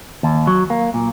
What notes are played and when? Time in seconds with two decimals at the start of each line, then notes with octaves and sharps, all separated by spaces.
0.23 D#2
0.47 F#3
0.70 A#3
0.94 A#2